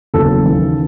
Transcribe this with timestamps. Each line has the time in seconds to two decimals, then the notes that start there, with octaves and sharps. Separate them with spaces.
0.14 F#1 E2 C#3 F#3 A4
0.45 D#2 C#3 E3